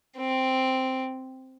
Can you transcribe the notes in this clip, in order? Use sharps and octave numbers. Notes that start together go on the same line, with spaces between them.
C4